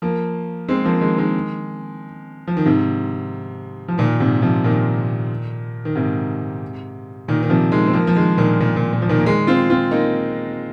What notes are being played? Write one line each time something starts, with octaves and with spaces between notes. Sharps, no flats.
F3 A#3
G#3 C4
F3 A#3
D#3 G#3
D#3 G#3
F3
D#3
G#2 C3
F3
A#2 D#3
G#2 C3
C3 F3
A#2 D#3
D#3
G#2 C3
A#2 D#3
D#3
C3 F3
D#3 G#3
C4
F3 A#3
F3
D#3 G#3
A#2 D#3
A#2
A#2
A#2
F3
A#2 D#3
A#3
D#3 G#3
C4 F4
C4 F4
A#3 D#4